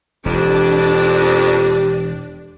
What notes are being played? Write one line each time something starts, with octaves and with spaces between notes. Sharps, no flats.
E1 F2 E3 D4 G4